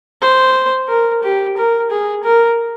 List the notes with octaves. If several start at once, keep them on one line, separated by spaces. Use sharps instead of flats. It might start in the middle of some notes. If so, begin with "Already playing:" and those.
C5
A#4
G4
A#4
G#4
A#4